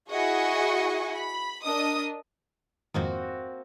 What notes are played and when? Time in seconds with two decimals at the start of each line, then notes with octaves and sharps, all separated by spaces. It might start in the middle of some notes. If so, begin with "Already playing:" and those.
0.10 E4 F#4 G#4 D#5 F#5 C#6
1.14 B5
1.63 D4 A#4 D#5 D#6
2.94 F2 G#2 D#3 A#3 C4 F#4